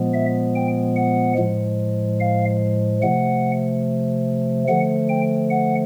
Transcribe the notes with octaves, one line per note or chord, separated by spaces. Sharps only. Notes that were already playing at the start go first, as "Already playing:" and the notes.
Already playing: A#2 F3 G#3 B3
E5
G5
F#5
A2 F3 G#3
F5
C3 F3 A3 F#5
D3 F3 A3 F#5
G5
F#5